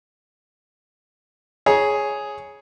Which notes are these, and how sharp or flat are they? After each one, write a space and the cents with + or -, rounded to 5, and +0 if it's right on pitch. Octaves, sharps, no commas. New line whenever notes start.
G#4 +5 C#5 +0 A#5 +40